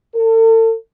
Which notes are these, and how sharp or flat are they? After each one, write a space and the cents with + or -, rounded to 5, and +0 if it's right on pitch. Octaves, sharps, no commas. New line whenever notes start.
A4 +40